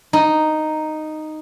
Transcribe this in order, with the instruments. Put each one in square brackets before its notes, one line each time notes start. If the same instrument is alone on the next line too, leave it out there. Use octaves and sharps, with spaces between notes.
[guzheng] D#4